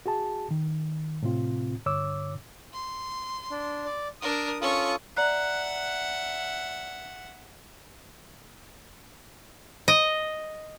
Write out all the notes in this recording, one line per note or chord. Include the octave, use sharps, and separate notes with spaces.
F#4 G#4 A5
D#3
A2 C3 C4 F4
G2 D3 C#5 D6 E6
C6
D4
D5
D4 A#4 D#6
C#4 F4 A4 C#6 D#6
D5 E5 F#5 A#5 F#6
D#5